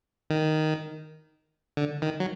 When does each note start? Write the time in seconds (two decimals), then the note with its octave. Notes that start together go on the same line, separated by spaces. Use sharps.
0.30 D#3
1.77 D3
2.02 D#3
2.20 F#3